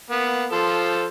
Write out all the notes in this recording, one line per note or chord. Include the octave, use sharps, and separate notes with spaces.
A#3 B3
F3 A4 C5